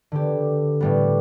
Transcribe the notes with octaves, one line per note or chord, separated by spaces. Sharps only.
D3 B3 G4
A2 G3 B3